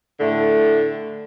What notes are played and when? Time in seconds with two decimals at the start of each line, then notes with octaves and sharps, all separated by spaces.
0.20 A2 D3 A3